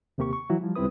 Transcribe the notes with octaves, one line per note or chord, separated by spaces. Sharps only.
D#2 C3 A#3 G4 C#6
C#6
E3 F#3 E4 F#4
F3 G3
C#2 G3 C4 E4 B4 D#6